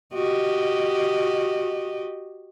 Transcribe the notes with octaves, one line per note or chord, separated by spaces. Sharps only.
F#4 G4 D#5